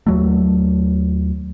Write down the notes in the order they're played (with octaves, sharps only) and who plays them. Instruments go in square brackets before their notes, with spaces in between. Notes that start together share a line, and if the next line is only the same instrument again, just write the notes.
[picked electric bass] D#2 F#3 A3